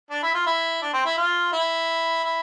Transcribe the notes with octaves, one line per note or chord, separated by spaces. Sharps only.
D4
E4
F4
E4
D4
C4
E4
F4
E4
E4